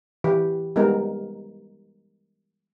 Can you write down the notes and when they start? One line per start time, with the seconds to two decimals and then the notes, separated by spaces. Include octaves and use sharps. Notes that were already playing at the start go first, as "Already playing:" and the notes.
0.24 E3 G4 B4
0.76 G3 G#3 B3 D#4 A#4